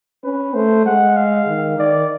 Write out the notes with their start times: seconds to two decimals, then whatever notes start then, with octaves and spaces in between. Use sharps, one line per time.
0.24 C#4 B4
0.54 A3 C5
0.85 G#3 F#5
1.16 F5
1.47 D#3
1.78 D#3 D5